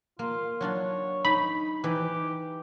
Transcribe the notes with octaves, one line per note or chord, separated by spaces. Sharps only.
A#3 F4
F#3 D4 F4 C#5
D#4 B5
E3 D#4 G4